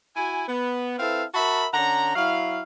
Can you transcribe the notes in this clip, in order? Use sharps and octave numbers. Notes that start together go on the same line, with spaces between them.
E4 F#4 G#5
B3
C4 E4 A4 B4 F5
F#4 A#4 E5 A5 B5
D3 C#4 F#5 A#5
F#3 E4 F5